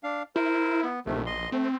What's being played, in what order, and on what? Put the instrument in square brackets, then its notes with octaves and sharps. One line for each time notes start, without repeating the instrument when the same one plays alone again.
[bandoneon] D4 F5
[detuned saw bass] E4 [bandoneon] A#4 C5
[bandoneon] B3
[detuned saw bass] A#1 [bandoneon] C3 D#3 A3
[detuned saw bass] A#1 [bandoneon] D#5 C6
[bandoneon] A3 [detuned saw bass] C4